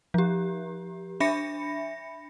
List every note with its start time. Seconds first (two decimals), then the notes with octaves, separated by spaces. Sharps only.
0.14 F3 G4
1.20 D4 E5 B5 A#6 C#7